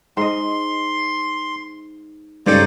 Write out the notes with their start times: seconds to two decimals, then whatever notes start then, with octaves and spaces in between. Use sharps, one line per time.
0.17 G#2 D#5 C6
2.47 G2 C#3 G#3 D#4 A4 C5 D5